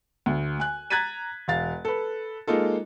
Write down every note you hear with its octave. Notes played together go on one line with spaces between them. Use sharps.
D2
G#5 F#6
A#5 F#6 G#6 A6 B6 D#7
E1 F5 A6
A4 B4
G#3 A#3 D#4 F4 A4